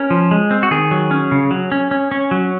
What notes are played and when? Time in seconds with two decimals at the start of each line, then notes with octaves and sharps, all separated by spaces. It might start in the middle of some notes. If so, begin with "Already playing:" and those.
Already playing: C#4 A#4
0.10 F3
0.31 G#3
0.51 C4
0.63 F#4
0.71 D#3 G#4
0.91 F#3
1.11 C#4
1.31 C#3
1.51 F#3
1.72 C#4
1.91 C#4
2.11 C#4
2.31 F#3